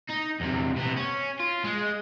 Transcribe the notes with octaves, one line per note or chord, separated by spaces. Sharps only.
D#4
E2 C3
C3 B3
C#4
F4
G#3